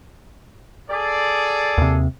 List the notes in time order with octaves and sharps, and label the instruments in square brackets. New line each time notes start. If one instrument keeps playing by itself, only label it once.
[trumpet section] G#4 A4 D5
[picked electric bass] D#2 C3